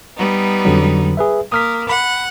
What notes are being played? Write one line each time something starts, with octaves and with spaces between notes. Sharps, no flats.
G3 B3 D#4
F2 D3 F#3
G#4 B4 E5
A#3 D#6 F6 B6
F#5 B5